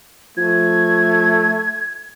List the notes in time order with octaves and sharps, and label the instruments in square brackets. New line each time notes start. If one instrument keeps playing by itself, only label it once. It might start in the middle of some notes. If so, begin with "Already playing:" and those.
[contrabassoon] F3 [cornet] A3 [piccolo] G#6